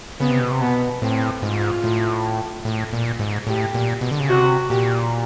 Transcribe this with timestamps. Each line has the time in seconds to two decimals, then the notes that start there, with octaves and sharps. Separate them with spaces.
0.20 C#3 B3
0.30 C3
0.40 B2
0.51 C3
0.61 B2 B3
1.02 A2 C4
1.42 G#2 F4
1.84 A2
2.65 A2
2.93 A#2
3.19 G#2
3.47 A2 G4
3.74 A#2
4.01 B2
4.11 D3
4.20 C#3
4.29 C3 F#4
4.69 A#2 G4